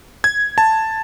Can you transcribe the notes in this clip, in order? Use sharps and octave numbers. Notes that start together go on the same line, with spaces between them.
G#6
A5